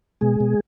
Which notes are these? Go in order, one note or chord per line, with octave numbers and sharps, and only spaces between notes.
B2 G#3 G#4
B2